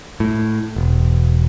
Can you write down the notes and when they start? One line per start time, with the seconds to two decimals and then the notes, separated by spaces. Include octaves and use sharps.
0.20 A2
0.76 E1